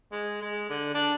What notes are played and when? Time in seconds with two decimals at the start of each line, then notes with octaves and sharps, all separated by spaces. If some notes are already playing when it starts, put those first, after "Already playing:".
0.12 G#3
0.42 G#3
0.70 D3
0.94 D4